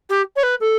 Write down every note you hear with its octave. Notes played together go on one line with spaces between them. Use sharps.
G4
C#5
B4
A4